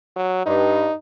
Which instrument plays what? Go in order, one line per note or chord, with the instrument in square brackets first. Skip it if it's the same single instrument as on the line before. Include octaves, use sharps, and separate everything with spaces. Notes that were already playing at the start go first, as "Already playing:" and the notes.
[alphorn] F#3
[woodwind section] G2 [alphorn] D#4